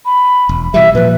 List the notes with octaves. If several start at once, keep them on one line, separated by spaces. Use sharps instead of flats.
B5
E1
B2 E3 G3 E5
A#2 F3 B4